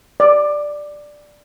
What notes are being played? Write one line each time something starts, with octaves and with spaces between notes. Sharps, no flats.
D5